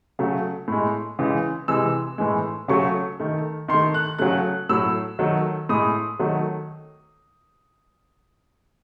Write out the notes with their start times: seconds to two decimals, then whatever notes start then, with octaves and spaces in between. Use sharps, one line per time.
0.19 C#3 F#3 A3
0.68 A2 G#3
1.19 C#3 E3 G#3
1.68 C3 E3 G#3 E6
2.18 A2 E3 G#3
2.68 C#3 F#3 A3 C#6
3.20 D#3 A3
3.68 D#3 C6
3.74 A3
3.94 F#6
4.19 C#3 F#3 A3 F#6
4.69 A2 F#3 A3 E6
5.19 D#3 F#3 A3
5.69 A2 G#3 D#6
6.19 D#3 F#3 A3